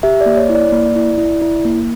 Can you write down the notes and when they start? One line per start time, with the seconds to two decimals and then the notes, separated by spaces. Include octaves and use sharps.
0.03 G4 E5
0.21 D5
0.26 A#3
0.37 C#5
0.49 E4
0.55 D5
0.72 A#3
0.96 E4
1.18 E4
1.42 E4
1.65 A#3